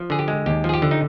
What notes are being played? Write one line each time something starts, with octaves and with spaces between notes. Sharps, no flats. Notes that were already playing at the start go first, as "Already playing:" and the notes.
Already playing: F3
D3 G#4
G4
G#3
D#2 G4
F3
G#4
G4
D3
D#4